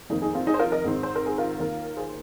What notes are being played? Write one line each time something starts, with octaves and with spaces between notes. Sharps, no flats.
F1 F2 D#3 A#3 D#4
D#4 G#4
C4 F4
D#4 G#4
C5
F4 A#4
A#4 D#5
G#2 D#3 C4
C5
A#4
G#4
F4 A#4
D#2 D#3 A#3
G#4 C5